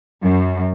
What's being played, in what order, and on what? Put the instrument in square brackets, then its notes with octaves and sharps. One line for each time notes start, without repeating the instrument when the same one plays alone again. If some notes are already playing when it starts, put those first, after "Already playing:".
[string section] F#2